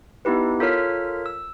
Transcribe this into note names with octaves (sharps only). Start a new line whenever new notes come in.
B3 D#4 E4 G4 B4
F4 A4 A#4 C#5 F6 B6
E6